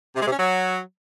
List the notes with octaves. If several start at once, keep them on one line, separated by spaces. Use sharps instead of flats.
C3
G#3
C3
C#4
F#3